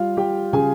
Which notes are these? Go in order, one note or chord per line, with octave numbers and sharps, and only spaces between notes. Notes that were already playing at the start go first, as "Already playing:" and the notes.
Already playing: G3 F4 F5
G3 G4 G5
C#3 G#4 G#5